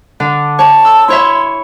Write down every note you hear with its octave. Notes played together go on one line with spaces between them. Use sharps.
D3 D4
C#5 A5
E6
E4 C#5 E5 C6